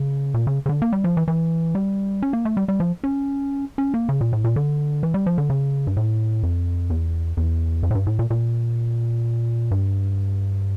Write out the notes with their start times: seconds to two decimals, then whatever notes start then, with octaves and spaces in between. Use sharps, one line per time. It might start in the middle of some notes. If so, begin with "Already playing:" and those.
Already playing: C#3
0.34 A#2
0.47 C#3
0.66 C#3
0.69 D3
0.82 A#3
0.92 G3
1.04 F3
1.17 E3
1.28 E3
1.75 G3
2.22 C#4
2.33 A#3
2.45 A3
2.57 G3
2.68 G3
2.80 F3
3.04 C#4
3.78 C#4
3.94 A#3
4.09 C#3
4.21 A#2
4.33 A2
4.44 A#2
4.56 D3
5.03 E3
5.14 G3
5.26 F3
5.38 D3
5.50 C#3
5.87 G2
5.97 A2
6.43 F2
6.90 E2
7.37 E2
7.83 F2
7.91 A2
7.95 G2
8.07 A2
8.19 A#2
8.30 A#2
9.71 G2